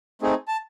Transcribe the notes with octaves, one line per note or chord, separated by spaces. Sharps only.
A3 C4 D#4 G#4
A5